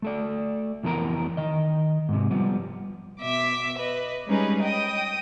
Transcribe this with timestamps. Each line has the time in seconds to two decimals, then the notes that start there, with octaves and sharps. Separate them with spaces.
0.02 A3 A4 D5
0.83 F2 E3 B3 A#4 A#5
1.37 D#3 D#5
2.09 G#2 C3
2.31 F3 G3 B3
3.20 B2 E5 D6
3.77 B4 D#5
4.27 G3 G#3 C#4 D#4 G#4 B4
4.62 D#5 G5 D#6